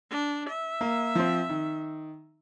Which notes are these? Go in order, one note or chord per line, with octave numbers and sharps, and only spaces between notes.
D4
E5
A#3
F3 C4
D#3